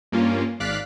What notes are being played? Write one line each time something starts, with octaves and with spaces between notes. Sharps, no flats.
G2 A#3 C#4 F4
G#1 D5 F5 F#6 B6